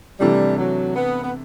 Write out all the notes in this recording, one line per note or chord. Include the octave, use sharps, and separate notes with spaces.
C3 E3 G3 A3 D4
F#3
B3
B3